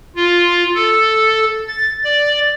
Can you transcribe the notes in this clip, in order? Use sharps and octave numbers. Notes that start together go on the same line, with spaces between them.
F4
A4
A6
D5